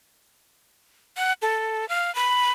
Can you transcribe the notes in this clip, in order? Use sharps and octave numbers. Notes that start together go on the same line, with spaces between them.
F#5
A4
F5
B5